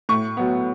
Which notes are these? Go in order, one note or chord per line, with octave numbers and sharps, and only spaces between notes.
A2 C#6
F#3 B3